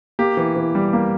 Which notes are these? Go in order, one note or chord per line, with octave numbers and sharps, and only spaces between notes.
A#3 G4
E3
E3
G3
A#3